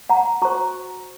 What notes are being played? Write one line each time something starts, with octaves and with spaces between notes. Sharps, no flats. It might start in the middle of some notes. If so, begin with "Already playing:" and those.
F#5 A#5
F#4 C5 A#5 C#6